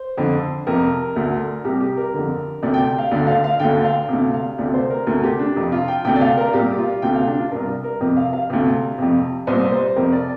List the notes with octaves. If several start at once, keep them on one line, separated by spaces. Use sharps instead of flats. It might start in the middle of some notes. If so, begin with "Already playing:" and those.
Already playing: C5
F2 D3
F2 C3 A#4
D2 D3
C2 C3 G4
G4
A#4
F2 D3
D2 C3 D5
G5
G5
F5
D2 D3 D5
F5
F5
D2 D3 G5
F5
D2 C3
F5
D2 C3 D5
C5
A#4
D2 C3 A#4
G4
D4
F2 C3
F4
G5
D2 C3 G5
D5
F5
A#4
C2 A#2 G4
F4
D2 C3 G5
F5
D4
F4
C2 C3 A#4
A#4
F2 C3
F5
F5
D2 C3
F2 C3
C2 A#2 C5
C5
F2 C3 A#4
D5